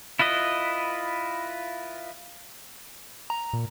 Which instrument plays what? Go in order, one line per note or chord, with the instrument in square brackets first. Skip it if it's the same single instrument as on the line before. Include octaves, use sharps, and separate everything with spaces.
[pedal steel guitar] E4 F4 B4 D#5
[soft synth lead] A#5
[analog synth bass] A#2